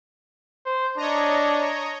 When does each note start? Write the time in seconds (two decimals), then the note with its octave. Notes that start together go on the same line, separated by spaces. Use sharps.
0.66 C5
0.98 D4 C#5 D#5 A#5